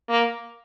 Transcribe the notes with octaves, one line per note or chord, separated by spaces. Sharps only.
A#3